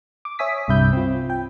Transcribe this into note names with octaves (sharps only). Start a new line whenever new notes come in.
D6
C#5 E5 G#5 D#6 B6
C2 G2 C3 E5 B5 G6
C4 F4
G5